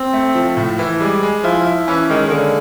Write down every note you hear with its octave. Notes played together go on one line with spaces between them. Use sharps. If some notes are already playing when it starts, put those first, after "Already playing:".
Already playing: C4
A3
F3
A2
E3
G3 G#3
G#3
F3 E4
E4
E3 C#4
D#3 G#3
D#3
D3 A#3